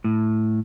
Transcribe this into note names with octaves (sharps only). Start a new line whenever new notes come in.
A2